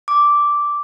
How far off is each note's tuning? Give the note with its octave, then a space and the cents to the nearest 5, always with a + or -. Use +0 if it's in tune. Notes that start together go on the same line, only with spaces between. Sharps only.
D6 -5